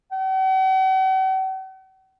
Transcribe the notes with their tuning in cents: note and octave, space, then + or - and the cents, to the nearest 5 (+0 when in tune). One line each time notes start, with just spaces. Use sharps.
F#5 +45